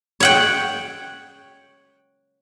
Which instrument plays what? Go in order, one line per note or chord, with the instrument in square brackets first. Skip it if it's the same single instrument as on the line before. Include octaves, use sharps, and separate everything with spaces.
[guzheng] C#5 F#5 G5